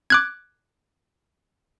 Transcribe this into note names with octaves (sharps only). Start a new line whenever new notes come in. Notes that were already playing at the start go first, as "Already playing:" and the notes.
D6 F#6 G#6